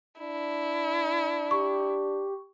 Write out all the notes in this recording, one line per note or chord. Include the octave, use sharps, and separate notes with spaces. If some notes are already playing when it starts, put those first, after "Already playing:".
D4 E4
G4 C#6